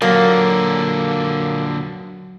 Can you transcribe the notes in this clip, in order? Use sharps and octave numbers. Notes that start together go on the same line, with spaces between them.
A#2 D3 F#3 A#3